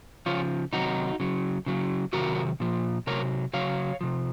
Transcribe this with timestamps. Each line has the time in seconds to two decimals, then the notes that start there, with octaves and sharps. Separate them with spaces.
0.26 C#3 F3 C#4 F4
0.73 C3 D#3 F#3 D#4 F#4
1.20 C#3 F#3
1.66 C#3 F#3
2.13 C3 D#3 F#3 F#4 A#4
2.60 A#2 F3
3.07 C3 F#3 A#4 C#5
3.54 C#3 F#3 C#5 F5
4.01 C3 F3